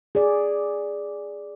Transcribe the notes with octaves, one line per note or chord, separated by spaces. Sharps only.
G#4 D5